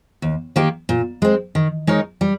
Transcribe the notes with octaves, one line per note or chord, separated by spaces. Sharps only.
D#2
D#3 A#3 D#4 G4
A#2
G#3 C4
D#3
G#3 D#4 A#4 C#5
G3